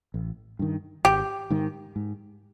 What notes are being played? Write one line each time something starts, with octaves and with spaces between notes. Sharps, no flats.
A1
G2 D#3
G#1 G4
G#2 D#3
G#2